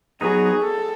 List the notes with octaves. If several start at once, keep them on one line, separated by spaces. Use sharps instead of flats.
F#3 B3 D#4 G#4
A4